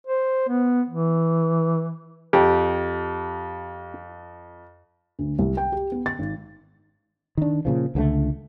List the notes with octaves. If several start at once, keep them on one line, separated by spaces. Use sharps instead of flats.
C5
B3
E3
F2 G4
D2
C2
G5
G4
B3
A6
G#1
D#3 D4
A#2 C#3 F3
C#2 D3 F3 A3